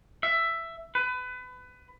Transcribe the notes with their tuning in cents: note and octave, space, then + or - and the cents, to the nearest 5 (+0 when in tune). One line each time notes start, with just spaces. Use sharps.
E5 +10
B4 +25